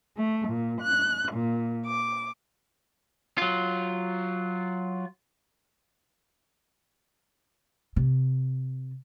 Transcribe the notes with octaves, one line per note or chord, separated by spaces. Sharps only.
A3
A#2
F#6
A#2
D6
F#3 F4
C3